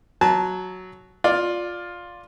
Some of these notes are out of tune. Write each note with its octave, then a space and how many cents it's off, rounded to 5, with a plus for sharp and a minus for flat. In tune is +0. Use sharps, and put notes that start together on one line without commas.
F#3 +0 A5 -25
F4 +10 D5 +0